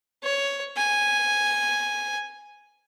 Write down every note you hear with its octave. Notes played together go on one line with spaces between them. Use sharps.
C#5
G#5